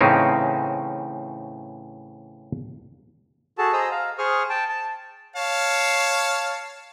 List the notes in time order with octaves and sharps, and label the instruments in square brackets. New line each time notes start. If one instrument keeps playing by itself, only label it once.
[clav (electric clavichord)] A2 C#3 E3 C4 C#4 D#4
[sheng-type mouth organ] F#4 G#4 A4 A5
G#4 C5 D#5 A#5 D#6 E6
F5 A#5
G#4 C5 C#6 D#6 F6
G5 A5
A5
[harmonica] C#5 F5 A5